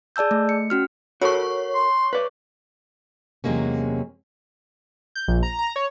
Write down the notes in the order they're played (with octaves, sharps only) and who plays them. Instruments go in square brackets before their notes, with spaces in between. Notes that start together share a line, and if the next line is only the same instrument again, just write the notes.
[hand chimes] G#4 D5 A5 E6 G6
A3
C#7
C#4 F#4 F6
[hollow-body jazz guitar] F#4 A4 A#4 [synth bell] C#5 C#6
[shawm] C6
[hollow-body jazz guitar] B4 D5
[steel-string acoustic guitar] E2 C3 F#3 G#3 A#3 C#4
[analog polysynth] G6
A#1
A#5
A#5
C#5